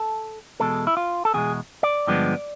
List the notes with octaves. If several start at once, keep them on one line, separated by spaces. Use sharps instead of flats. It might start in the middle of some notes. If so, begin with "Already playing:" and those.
Already playing: A4
E2 B2 G#3 A4
E4
F4
A4
E2 B2 G#3 G#4
D5
G2 D3 F3 G#3 B3